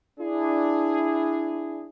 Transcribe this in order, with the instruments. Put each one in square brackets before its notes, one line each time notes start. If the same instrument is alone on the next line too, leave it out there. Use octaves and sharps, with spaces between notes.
[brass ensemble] D4 E4 G#4